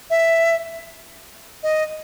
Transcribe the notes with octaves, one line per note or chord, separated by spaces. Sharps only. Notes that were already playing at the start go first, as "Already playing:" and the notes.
E5
D#5